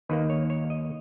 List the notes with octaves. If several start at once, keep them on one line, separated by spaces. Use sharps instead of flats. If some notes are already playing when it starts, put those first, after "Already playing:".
D#2 D#3 A#3 B4
C#5
C#5
D#5